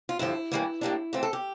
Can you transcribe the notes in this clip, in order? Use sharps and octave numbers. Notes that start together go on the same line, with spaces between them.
F4
G2 D3 F3 E4
G2 E3 G3 A#3
A2 G3 A#3 D4
E2 E3 A3 C4 F4
A4
G4